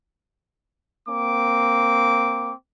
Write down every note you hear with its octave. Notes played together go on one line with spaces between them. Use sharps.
A#3 C4 D6